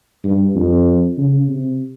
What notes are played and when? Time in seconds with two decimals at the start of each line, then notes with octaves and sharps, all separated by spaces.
0.24 G2
0.55 F2
1.18 C#3
1.48 C3